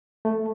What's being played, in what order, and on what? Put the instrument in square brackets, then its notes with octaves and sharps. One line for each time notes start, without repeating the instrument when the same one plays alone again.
[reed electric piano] A3